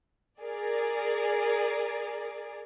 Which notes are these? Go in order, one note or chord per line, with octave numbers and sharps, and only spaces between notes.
G#4 A#4 D5